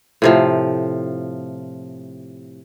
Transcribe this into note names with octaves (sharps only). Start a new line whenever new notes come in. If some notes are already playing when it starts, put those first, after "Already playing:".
A2 C3 F3